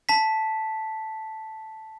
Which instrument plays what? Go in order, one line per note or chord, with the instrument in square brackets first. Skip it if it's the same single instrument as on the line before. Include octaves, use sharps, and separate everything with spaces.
[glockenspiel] A5 B6